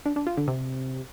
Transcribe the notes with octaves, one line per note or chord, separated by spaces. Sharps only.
D4
D4
F4
D3
C3